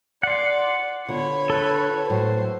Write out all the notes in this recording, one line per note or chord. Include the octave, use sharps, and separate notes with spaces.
D5 F#5 C6
D3 B3 F4 C#5 B5
A4 B4
A2 F#3 C5